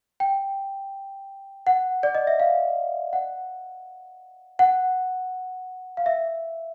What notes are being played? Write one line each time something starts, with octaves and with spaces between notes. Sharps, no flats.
G5
F#5
D5
D#5
E5
F5
F#5
F#5
F5
E5